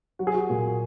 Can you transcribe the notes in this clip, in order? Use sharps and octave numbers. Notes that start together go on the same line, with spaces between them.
F#3 F#4
G#4
F#4
A#2